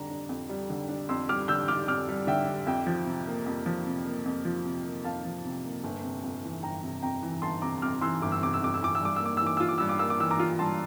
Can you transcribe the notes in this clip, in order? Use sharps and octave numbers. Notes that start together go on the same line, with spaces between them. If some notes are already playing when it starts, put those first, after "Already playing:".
Already playing: F2 D3 G3 A#5
D4
F2
G3
D3
D4
F2 C6 E6
G3 D6 F6
D3 E6 G6
D4 D6 F6
F2 D6 F6
G3
D3 E5 G5
D4
F2 E5 G5
F3
C3
A#3
F2
F3
C3
A#3
F2
F3
C3
A#3
F2 F5 A5
F3
C3
A#3
G1
C3
F2
E3
G1 G5 A#5
C3
F2 G5 A#5
E3
G1 A5 C6
C3 A#5 D6
F2 D6 F6
E3 C6 E6
G1 D6
E6
C3 D6
E6
F2 D6
E6
E3 D6
E6
G2 D6
A#3 E6
D6
E3 E6
D6
F4 E6
D6
G2 E6
D6
A#3 E6
D6
E3 E6
A#5 D6
F4
G2 A5 C6